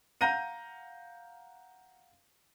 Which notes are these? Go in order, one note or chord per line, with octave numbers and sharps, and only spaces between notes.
F5 F#5 A#5 G6 A#6 D#7